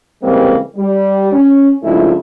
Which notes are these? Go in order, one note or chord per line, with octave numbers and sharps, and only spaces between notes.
C#3 E3 G3 G#3 A#3 C4
G3
C#4
G2 C#3 F3 G#3 A3 E4